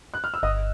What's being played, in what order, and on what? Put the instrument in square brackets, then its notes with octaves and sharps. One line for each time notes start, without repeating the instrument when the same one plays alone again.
[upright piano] F#6
F6
E6
[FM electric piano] G1 [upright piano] D#5 D#6